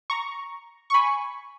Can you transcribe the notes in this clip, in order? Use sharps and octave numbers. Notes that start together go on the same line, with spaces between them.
A#5 C#6
C#6
G#5 B5